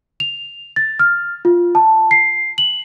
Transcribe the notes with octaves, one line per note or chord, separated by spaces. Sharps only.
F7
A6
F6
F4
A5
C7
F#7